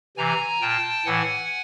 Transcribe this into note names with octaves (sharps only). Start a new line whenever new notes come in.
C3 E3 G#5 A#5
A#2 G5 A5
A2 E3 F#5 G#5